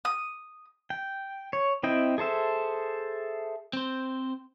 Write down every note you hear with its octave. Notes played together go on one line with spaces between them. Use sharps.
D#6
G5
C#5
C4 E4 D#5 G5
G#4 A4 C5 E5
C4 C5